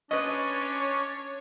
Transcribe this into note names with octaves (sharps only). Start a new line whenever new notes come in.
C#4 D4 B4 C#5 D#5